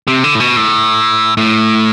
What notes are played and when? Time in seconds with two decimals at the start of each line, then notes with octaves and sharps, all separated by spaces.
0.07 C3
0.24 D3
0.35 A2
0.40 B2
0.56 A2
1.37 A2